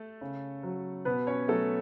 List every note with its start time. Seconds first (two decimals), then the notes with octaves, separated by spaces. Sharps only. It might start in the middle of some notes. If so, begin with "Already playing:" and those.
Already playing: A3 A4
0.21 C#3
0.63 F#3
1.05 B2 B3 B4
1.27 C#4 C#5
1.48 F#3 A3 A4